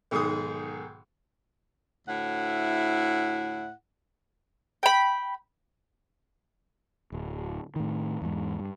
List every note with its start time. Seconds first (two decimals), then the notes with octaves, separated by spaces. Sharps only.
0.11 B1 G#2 D#3 G#4 D#6
2.08 D2 A2 E4 F#5
4.83 G5 B5
7.12 D1
7.76 A2 D#3
8.22 E2 G#2
8.60 G2